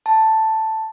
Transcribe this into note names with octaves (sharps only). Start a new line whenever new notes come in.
A5